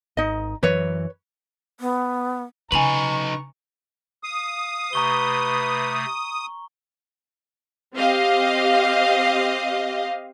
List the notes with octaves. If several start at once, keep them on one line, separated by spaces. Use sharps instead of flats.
G#1 D#4 D#5
F#2 E3 F#3 B4 C#5
B3
C#3 D#4 B4 G#5 A#5 C#6 F7 F#7
F5 D#6
C3 A3 B4 A#5 C#6 G7
C4 G4 D#5 F5